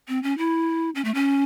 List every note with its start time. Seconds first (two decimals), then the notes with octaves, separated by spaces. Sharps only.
0.08 C4
0.23 C#4
0.38 E4
0.95 C#4
1.05 A3
1.15 C#4